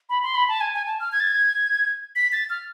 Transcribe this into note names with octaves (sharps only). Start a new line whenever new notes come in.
B5
C6
B5
A5
G#5
G#5
A5
F6
G#6
A6
G#6
B6
A6
F6